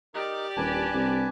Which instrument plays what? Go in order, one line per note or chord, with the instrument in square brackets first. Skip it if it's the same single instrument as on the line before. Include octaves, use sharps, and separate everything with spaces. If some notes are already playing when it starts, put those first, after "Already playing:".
[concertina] D#4 [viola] G4 D5 [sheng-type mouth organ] A#4
[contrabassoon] D#1 [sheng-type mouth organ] D4 B4 [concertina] G#5 A5
[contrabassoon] C2